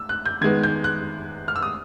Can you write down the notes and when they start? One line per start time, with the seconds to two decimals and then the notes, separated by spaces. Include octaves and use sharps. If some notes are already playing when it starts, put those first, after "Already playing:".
Already playing: E6
0.09 F#6
0.26 G6
0.41 D#3 G#3 B3 G#6
0.64 G6
0.84 F#6
1.48 F6
1.56 E6
1.62 D#6